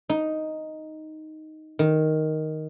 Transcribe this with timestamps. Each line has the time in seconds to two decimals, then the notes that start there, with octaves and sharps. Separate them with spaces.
0.09 D#4
1.79 D#3